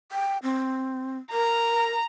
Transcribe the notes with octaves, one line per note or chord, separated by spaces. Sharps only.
G5
C4
A#4 A#5